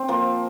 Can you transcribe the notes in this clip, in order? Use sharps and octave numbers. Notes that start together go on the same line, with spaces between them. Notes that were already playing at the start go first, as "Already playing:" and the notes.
Already playing: C4
F3 A#3